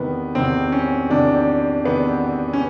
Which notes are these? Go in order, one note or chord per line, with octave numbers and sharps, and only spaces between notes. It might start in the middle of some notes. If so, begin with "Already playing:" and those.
Already playing: E2 C3 D#3 B3
E2 C3 D#3 C4
C#4
E2 C3 D#3 D4
E2 C3 D#3 B3
C#4